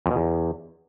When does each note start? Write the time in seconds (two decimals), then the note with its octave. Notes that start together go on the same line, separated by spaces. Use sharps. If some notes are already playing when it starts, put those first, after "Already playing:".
0.06 F2
0.11 B2
0.16 E2